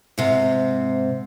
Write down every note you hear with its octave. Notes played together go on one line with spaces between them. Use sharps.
G#2 C3